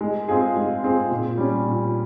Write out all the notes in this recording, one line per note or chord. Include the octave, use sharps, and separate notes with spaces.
G#3
C4 F4 G#4
G#3
C4 F4 G#4
A#2
G3 C#4
A#2